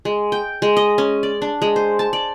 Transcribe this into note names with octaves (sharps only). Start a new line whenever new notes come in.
G#3
G5
G#3
D#5
C#4
D5
D4
G#3
C5
A5
D5